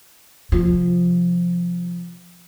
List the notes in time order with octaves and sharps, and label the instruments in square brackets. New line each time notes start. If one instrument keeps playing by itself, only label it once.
[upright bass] C3 F3